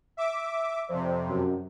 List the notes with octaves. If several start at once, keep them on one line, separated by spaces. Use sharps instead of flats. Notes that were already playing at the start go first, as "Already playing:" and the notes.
E5 D6
F2 C3 C5 D5
F#2